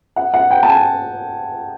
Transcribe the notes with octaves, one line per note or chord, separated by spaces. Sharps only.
F#5
F#5
G5
A5
G#5